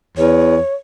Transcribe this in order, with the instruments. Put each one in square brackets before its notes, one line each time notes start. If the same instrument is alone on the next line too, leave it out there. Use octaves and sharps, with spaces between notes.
[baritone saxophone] E2 [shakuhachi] C#5